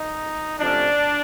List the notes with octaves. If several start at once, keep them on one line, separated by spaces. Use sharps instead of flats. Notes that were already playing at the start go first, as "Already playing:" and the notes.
Already playing: D#4
C3 F3 A3 C#4 D4